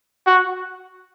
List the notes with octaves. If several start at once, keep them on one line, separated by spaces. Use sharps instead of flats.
F#4